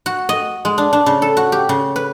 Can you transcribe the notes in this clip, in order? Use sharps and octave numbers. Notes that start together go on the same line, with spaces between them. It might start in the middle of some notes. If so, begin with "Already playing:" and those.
F#4
D#5
G#3
D4
D4
C#3
A4
F#4
G4
C#3
B4